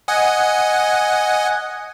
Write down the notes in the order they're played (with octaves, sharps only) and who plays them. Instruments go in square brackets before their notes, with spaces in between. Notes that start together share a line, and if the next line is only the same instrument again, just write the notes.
[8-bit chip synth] D#5 F#5 G#5